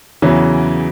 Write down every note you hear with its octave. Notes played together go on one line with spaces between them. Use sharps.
E2 C#3 E3 F#3